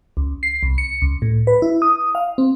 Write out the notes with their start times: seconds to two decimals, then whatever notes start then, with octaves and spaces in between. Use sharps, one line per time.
0.17 C#2
0.43 C7
0.63 C2
0.78 C#7
1.02 C#2
1.22 A2
1.47 B4
1.62 E4
1.82 D#6
2.15 F5
2.38 C4